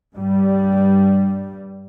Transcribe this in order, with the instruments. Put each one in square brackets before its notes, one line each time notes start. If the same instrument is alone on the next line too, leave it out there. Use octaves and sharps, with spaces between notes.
[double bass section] G2 G3